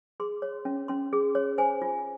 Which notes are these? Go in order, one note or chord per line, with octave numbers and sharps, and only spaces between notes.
G#4 C6
C#5
C#4
C#4 C6
G#4
C#5
C5 G#5
F4